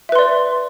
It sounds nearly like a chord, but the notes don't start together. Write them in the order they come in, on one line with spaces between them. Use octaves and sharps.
E5 B4 C6 D5